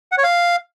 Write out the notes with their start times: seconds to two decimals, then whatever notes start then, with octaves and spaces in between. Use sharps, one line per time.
0.12 F#5
0.18 C#5
0.24 F5